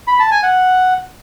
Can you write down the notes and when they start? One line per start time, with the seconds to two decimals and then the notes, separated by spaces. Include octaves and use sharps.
0.07 B5
0.19 A5
0.31 G#5
0.43 F#5